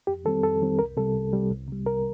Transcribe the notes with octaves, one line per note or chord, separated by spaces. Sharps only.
F2 G4
D#3 G3 C4 A4
F2 A4
D#3 G3 C4
C2 A#4
C3 G3 A4
C2
C3 G3
C2
C3 G3
C2 A#4